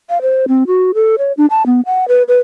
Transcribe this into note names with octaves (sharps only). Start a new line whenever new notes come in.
F5
C5
C4
F#4
A4
C#5
D4
A5
B3
F#5
B4
B4